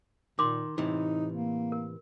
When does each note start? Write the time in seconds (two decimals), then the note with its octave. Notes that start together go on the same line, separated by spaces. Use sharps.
0.39 A#2 D#3 C6 D6
0.78 A2 C3 E3 D#4
1.33 A#3
1.72 A#4